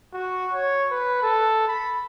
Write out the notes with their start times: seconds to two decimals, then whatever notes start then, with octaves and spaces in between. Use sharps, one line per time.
0.14 F#4
0.53 C#5
0.91 B4
1.22 A4
1.68 B5